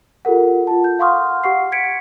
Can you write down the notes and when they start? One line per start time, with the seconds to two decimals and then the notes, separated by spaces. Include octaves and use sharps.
0.25 F4 G4 A4 A#4 F#5
0.67 F4 A5
0.84 G6
0.99 F5 F#5 C6 C#6 D#6 F6
1.44 G4 F#5 C#6 C7
1.72 G#6 B6 C#7 D7